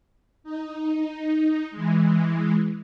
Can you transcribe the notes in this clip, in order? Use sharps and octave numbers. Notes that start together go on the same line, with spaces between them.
D#4
E3 G#3